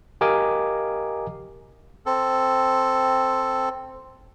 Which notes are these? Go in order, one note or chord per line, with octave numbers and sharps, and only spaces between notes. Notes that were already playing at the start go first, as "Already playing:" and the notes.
G4 A#4 D#5 F5 G#5 D6
C4 A4